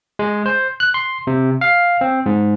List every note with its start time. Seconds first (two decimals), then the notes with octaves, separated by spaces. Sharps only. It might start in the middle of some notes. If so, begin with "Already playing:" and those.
0.19 G#3
0.46 C5
0.80 F#6
0.94 C6
1.27 C3
1.61 F5
2.01 C4
2.26 G#2